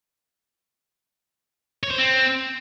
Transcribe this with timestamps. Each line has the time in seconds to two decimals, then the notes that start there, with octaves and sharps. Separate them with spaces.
1.83 C#5
1.91 C5
1.98 C4